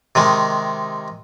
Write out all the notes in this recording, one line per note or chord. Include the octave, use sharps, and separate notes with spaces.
C3 D#3 G#3